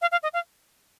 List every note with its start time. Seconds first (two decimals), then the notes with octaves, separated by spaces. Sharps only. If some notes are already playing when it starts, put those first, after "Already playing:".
0.02 F5
0.12 F5
0.23 D#5
0.33 F5